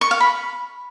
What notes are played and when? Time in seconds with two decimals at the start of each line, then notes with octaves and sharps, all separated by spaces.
0.01 C#6
0.11 F5
0.20 B5